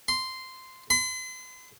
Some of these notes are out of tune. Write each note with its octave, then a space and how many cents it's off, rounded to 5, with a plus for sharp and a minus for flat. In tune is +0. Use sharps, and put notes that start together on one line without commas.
C6 -10
C6 -45